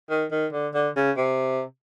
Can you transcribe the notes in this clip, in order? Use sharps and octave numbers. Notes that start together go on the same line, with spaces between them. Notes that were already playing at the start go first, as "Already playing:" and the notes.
D#3
D#3
D3
D3
C#3
C3